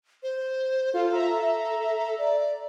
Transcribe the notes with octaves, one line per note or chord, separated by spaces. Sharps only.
C5
F4 A4
E5 A#5
D5